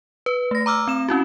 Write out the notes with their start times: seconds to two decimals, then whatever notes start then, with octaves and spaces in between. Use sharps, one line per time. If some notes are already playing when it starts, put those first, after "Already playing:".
0.26 B4
0.51 A3 A#6
0.66 A#5 D6 E6 F6
0.87 C4 E7
1.09 C#4 E4 F#4